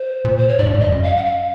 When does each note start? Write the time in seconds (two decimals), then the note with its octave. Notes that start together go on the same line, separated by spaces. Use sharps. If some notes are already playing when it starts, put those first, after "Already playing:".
Already playing: C5
0.25 A#2
0.38 C5
0.48 C#5
0.58 G#2 D5
0.66 G2
0.74 G#2
0.80 G2 D#5
0.92 F#2
1.03 F5
1.17 F#5
1.25 F5